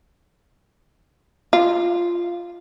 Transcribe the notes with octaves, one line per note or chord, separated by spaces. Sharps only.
F4